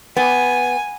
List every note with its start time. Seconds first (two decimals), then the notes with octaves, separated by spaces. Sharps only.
0.17 B3 G#5